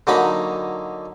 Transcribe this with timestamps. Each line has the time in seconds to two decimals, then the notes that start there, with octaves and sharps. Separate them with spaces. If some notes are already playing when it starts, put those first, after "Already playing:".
0.07 D3 F#3 A#3 D#4 G#5 B5